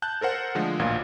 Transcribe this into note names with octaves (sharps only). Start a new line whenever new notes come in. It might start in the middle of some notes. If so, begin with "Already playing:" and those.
A5 F#6 G6
A4 A#4 C5 F#5
D3 F3 G#3 A3
A1 D2 A#2 F5 G#6